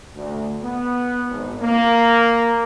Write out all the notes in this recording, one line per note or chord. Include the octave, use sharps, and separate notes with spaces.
D2
B3
G#1
A#3